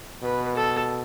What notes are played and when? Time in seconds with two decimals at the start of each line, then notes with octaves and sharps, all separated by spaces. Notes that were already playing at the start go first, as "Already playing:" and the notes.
0.22 B2 B4
0.55 A4